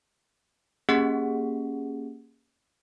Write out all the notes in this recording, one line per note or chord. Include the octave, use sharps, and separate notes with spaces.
A#3 C#4 G4 G#4 F#5